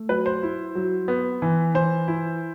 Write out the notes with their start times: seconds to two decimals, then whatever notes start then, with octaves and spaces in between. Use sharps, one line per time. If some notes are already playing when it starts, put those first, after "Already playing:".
Already playing: A3
0.09 F#3 B4
0.26 C5
0.43 E4
0.75 F#3
1.08 B3
1.42 E3
1.74 E3 C5
2.08 E4